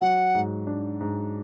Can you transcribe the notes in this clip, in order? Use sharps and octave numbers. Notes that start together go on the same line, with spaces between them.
F#3 F#5
G#2
D4
G#2